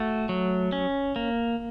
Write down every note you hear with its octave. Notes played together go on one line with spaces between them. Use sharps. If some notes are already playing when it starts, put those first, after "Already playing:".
Already playing: A3 F#4
F#3
C#4
A#3